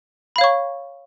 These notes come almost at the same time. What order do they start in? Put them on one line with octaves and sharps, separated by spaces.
B5 F5 C#5 C#6